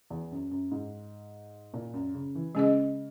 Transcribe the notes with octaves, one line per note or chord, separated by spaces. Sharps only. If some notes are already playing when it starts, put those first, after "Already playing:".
E2
F#2
F#2
G#2
A#2
F#2
C#3
E3
C#3 G#3 C#4 G#4 D#5